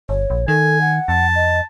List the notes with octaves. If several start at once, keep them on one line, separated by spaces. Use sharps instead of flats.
G1 C#5
A#1
D#3 A4 G#5
F#5
F2 A5
D#5